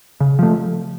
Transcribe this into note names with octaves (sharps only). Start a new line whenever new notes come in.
C#3
F3 A3